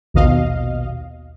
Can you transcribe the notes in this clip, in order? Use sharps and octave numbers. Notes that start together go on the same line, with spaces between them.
A#1 D#2 B2 D#5 F5